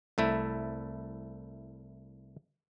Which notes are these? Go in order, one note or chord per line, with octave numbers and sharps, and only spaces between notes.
C2 A3 E4